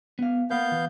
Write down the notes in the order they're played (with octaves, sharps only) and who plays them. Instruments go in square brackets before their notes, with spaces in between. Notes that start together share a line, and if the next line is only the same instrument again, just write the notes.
[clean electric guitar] B3 F5
[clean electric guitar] A#3 B4 [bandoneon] B3 F5 G6
[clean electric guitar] E3